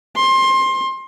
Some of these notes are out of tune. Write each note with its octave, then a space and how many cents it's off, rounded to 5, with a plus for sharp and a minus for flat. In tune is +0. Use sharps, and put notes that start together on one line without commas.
C6 +25